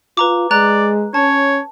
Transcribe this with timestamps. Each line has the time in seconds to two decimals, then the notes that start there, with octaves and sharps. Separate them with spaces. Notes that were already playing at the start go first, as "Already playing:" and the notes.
0.17 F4 B4 A#5 D6
0.51 G#3 D5 A#5 F#6
1.14 C#4 C#5 A5